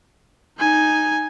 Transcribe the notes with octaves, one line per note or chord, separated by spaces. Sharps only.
D#4 G#5